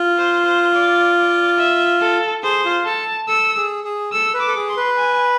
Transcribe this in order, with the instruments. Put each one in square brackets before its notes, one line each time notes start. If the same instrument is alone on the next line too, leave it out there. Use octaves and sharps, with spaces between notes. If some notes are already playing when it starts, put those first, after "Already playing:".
Already playing: [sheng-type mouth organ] F4
[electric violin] C5
C5
D5
D5
E5
A4
[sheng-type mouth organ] G#4 [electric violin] C5
[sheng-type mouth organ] F4
[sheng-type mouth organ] A4 [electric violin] A5
[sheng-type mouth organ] A4 [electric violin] E6
[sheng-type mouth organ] G#4
G#4
[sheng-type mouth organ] A4 [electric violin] E6
[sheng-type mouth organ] B4
[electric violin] D6
[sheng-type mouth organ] A4
G#4
[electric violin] C6
[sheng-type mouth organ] B4
[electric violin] G#5